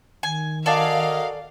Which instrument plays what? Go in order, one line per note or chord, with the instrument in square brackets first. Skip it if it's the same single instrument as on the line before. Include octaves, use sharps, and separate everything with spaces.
[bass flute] D#3 [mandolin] G#5
[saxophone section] F#4 A#4 D#5 [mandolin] A4 D5 G#5 [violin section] F5